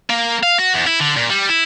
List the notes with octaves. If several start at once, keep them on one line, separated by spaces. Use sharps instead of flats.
A#3
F5
F#4
E2
E4
D3
A#2
G3
E4